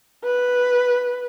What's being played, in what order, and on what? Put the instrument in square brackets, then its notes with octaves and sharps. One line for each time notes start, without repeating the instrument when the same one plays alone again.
[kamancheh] B4